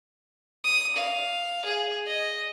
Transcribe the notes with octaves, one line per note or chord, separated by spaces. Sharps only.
D#6
F5
G#4
D#5